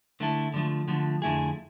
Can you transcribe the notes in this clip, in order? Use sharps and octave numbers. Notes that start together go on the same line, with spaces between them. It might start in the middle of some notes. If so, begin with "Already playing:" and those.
D3 A3 E4 A4
D3 F3 A3
D3 F3 A3
F2 D3 A3 E4 G#4